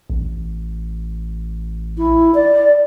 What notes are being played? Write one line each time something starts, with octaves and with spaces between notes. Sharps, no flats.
A1
E4
D5